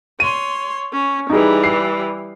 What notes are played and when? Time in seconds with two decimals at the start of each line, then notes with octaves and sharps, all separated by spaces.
0.20 C#5 C6 D#7
0.93 C#4
1.30 E3 G3 D#4 G#4
1.64 C7